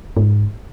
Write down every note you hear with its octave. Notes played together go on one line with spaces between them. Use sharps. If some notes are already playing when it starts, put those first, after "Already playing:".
G#2